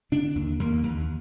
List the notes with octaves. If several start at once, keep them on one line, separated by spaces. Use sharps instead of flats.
D3 D4
D#2
D#2 A#3
D#2